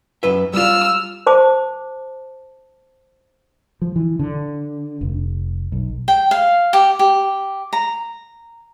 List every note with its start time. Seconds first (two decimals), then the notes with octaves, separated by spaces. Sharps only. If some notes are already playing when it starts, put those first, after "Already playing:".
0.23 F#2 B4 E5
0.53 G3 F4 E6 F6
1.27 C5 A5 D6
3.82 F3
3.96 E3
4.19 D3
5.01 F1
5.72 B1
6.08 G5
6.31 F5
6.73 G4
6.99 G4
7.73 A#5